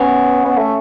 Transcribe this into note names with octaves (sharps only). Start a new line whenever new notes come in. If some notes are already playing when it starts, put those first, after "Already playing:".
Already playing: B3 C#4
B3
A3